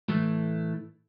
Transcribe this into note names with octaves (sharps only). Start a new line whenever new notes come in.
A2 E3 A3